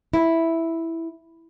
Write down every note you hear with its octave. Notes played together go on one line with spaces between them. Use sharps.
E4